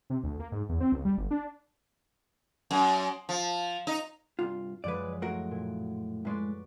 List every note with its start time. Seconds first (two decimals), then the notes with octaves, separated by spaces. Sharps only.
0.10 C3
0.23 D2
0.39 A#3
0.52 G#2
0.69 E2
0.80 C4
0.92 C#2
1.05 G3
1.18 G1
1.31 D4
2.71 F#2
3.29 F3
3.87 D#4
4.39 C2 G2 F4
4.84 F#2 F3 G#3 B4 D5
5.22 A2 F#4 A#4
5.51 A#2
6.25 A2 G#3 B4 D5 C#6